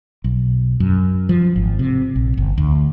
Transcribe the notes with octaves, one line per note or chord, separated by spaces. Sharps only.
B1
F#2
F3
G#1
C3
A#1
G1
D2